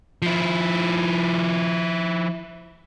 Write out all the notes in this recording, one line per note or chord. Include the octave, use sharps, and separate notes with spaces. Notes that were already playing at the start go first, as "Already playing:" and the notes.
F3 E4